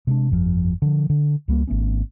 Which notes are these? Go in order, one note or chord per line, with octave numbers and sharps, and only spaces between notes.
C3 G#3 C4 D4
G1 F2 C#3 F3
D3 F3
D3
C#2 G3 A#3
G#1 A3 B3 C#4